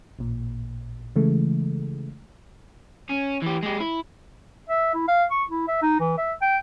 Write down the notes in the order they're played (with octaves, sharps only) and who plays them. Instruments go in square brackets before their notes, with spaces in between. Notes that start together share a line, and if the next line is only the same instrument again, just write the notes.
[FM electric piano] A1 A#2
C#3 E3 G#3 A3
[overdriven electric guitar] C#4
E3 G4
G#3 G4
E4
[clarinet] E5
E4
F5
C#6
E4
E5
D#4
E3
E5
G5